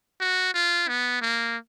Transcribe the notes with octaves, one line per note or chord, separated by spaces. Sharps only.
F#4
F4
B3
A#3